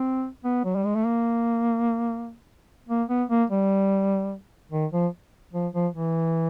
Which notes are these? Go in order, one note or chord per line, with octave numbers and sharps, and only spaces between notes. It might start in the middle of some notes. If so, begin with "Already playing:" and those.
Already playing: C4
B3
F#3
G3
G#3
A3
A#3
A#3
B3
A#3
G3
D#3
F3
F3
F3
E3